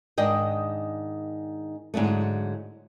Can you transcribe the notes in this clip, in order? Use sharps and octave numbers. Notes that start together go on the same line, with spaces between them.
G#2 D#3 D4 D#5 G5
G#2 D3 F#3 A3